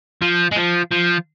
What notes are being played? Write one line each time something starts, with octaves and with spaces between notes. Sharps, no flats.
F3
G#3
F3
F3